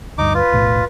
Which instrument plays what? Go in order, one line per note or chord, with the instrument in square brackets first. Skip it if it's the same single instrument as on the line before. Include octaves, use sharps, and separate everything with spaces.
[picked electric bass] D2 G2 [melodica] D#4 D6
[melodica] F4 [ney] B4
[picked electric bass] E1 B1 A2